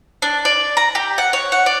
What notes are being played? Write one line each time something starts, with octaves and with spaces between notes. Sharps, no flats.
D4
D5
A#5
G4
F#5
C#5
F#5
D5